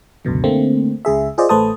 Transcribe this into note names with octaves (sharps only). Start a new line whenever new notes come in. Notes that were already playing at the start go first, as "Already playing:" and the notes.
C#2 F#2 B2 D3
D3 A3 A#3 C4
C#2 C#3 G#4 E5
F4 G#4 C5 D5 D#5
A1 A3 B4 C5 A5 D#6